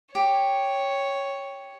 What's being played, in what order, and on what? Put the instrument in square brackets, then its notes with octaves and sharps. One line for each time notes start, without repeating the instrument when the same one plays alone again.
[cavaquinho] G4 [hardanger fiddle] C#5